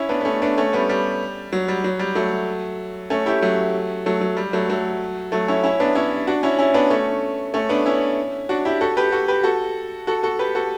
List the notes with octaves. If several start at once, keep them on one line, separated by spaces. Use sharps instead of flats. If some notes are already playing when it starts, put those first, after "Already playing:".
Already playing: C#4 E4
B3 D4
B3
A3 C#4
B3 D4
A3 C#4
G3 B3
G3
F#3
G3
F#3
G3
F#3 A3
A3 C#4
E4 G4
F#3 A3
F#3 A3
F#3
G3
F#3 A3
F#3 A3
F#3 A3
C#4 E4
C#4 E4
B3 D4
C#4 E4
D4 F#4
C#4 E4
C#4 E4
B3 D4
A3 C#4
A3 C#4
B3 D4
C#4 E4
D4 F#4
E4 G4
F#4 A4
G4 B4
F#4 A4
G4 B4
F#4 A4
F#4 A4
F#4 A4
G4 B4
F#4 A4